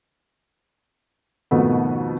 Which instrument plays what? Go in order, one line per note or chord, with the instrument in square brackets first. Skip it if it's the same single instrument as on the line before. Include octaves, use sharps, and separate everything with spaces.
[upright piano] F2 G#2 B2 D#3 A3 B3